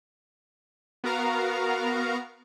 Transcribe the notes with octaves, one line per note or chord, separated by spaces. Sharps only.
B3 F#4 A#4 F5 A#5